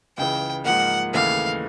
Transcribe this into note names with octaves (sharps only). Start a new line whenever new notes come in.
C#2 C#3 E3 G5
G#2 F3 A#3 F#5
D#2 C#3 E3 A3 F5